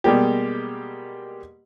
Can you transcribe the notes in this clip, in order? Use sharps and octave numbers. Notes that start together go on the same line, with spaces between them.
B2 G3 G#3 A#3 G4